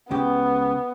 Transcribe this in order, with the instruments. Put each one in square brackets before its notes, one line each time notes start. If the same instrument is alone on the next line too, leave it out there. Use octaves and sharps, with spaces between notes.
[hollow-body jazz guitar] C#2 C#3 G4 [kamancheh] B3